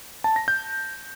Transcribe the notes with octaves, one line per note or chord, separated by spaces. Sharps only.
A5
A#6
G6